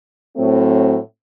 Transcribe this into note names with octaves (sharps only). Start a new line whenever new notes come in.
A2 F#3 A3 C4